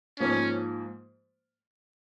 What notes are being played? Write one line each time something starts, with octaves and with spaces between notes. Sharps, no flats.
G#2 F3 A#3 C#4